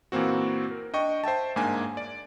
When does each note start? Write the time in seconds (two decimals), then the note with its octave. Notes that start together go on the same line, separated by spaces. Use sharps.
0.12 A#2 E3 A#3 C4 F#4
0.71 A#4
0.93 D4 D#5 G5 C#6
1.24 C5 E5 G5 A5
1.56 G1 G#2 A#3 D4 G#5
1.97 D5